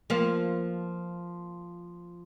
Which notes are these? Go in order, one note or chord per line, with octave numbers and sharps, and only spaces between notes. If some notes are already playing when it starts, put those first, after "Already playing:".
F3 A#3